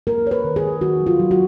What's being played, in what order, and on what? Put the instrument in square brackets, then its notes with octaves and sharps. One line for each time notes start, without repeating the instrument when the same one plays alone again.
[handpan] A#3 A#4
A#3 C#5
B4
D#3
G#4
D#3
D#3 F#4
F#3
F4
F#3
F#4